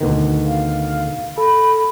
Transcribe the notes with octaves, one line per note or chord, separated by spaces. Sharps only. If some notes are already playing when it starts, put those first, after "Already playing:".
D2 B2 D#3
F5
A4 B5